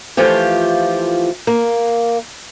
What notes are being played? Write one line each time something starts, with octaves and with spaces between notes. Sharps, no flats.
E3 F3 A3 F4 G4
A#3